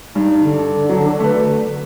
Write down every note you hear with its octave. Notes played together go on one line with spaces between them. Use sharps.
G2 D#4
D3
F#3
A3 B4